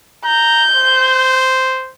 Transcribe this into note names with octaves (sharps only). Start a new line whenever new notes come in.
A#5 G6
C5